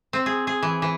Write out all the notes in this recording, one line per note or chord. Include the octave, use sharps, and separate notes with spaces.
C4
G#4
G#4
E3
E3